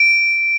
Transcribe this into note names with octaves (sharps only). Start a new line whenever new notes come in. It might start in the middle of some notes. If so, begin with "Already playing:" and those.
Already playing: D7